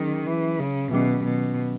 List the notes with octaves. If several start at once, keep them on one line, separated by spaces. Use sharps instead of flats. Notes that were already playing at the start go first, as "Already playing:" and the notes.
Already playing: D#3 F#3 C#4 G#4
E3
C#3
B2 D#3 F#3 C#4
B2